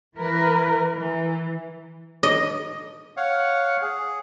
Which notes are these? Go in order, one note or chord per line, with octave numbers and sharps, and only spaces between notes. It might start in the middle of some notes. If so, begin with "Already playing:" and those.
E3 A#4 B4
E3
D#5
C#5 F5 F#5
G#4